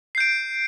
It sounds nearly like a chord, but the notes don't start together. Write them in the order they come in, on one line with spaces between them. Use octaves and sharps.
C7 G6 D7